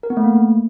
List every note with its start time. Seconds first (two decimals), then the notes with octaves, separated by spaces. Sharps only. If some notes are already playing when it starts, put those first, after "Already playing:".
0.03 A#4
0.10 B3
0.17 A3
0.24 A#3